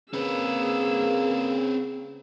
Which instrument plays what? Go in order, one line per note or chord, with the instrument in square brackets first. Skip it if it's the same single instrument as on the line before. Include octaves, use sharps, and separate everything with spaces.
[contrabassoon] C#3 [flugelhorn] A#3 [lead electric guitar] C4 B4 [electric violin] G#4 E6